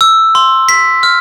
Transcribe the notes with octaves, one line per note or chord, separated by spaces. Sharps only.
E6
C6
B6
F6